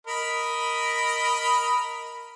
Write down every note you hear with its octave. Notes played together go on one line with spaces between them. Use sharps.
A#4 D#5 B5